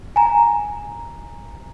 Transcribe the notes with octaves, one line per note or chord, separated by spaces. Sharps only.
G#5 A#5